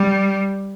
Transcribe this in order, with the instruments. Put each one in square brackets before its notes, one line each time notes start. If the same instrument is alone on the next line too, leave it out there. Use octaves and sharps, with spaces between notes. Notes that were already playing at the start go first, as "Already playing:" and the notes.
Already playing: [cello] G3